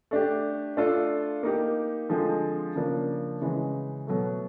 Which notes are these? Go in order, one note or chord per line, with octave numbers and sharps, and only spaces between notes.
A3 D4 G4
A3 D4 F4 A4
A#3 D#4 G4
D3 F3 G#3 C4
C#3 F3 A#3 D4
C#3 E3 G#3
B2 F#3 A3